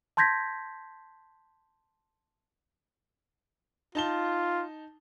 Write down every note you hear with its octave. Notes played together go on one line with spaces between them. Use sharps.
A5 C6 G6 G#6 A#6 B6
D#4 F4 A5 G7